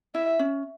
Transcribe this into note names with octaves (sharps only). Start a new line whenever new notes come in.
E4 E5
C#4